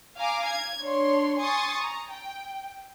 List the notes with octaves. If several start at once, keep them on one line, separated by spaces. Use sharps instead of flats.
F5 G#5 A#5 D6
G#6
D4 C#5 C6
G#5 C6 C#6 D#6 A6
A#5
G5